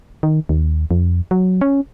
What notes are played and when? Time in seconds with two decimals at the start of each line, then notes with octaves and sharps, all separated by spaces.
0.23 D#3
0.49 D#2
0.91 F2
1.31 F#3
1.61 C#4